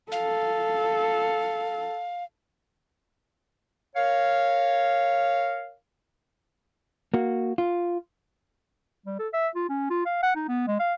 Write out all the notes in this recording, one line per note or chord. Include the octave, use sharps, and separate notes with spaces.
A4 F5
A#4 C#5 F5
A#3 F#4
F4
G3
A4
E5
F4
C#4
F4
F5
F#5
D#4
B3
G#3
F5